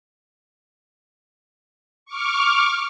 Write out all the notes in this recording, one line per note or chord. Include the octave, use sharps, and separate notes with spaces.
C#6 D6 F6